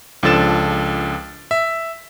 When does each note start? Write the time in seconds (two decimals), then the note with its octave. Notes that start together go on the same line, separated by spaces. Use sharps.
0.23 C#2 F3 D4 A4 A6 E7
1.51 E5